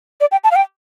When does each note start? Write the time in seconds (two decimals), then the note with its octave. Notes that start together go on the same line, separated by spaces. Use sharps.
0.21 D5
0.32 G5
0.44 A5
0.51 F5
0.56 G5